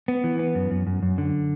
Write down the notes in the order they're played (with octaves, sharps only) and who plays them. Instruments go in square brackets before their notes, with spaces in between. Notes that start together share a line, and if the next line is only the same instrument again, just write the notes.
[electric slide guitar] B3
E3
B3
F#2
F#2
F#2
F#2
D3